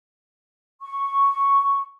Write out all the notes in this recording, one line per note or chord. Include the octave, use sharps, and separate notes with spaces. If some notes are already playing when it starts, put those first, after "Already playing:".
C#6